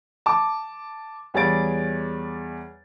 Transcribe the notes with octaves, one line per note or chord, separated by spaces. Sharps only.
A5 D6
E2 G3 G#4 C#5 A6 D7